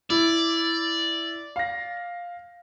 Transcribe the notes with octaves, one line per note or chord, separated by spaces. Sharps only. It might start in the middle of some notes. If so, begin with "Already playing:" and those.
E4 D5
F5 A#6